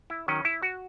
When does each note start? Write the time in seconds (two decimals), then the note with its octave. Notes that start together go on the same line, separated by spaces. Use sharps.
0.10 E4
0.28 D#3 F#3 C#4
0.45 E4
0.62 F#4